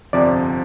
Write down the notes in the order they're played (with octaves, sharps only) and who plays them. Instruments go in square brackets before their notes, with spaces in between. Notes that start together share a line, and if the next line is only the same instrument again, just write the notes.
[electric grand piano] G1 F2 C3 F3 [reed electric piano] D5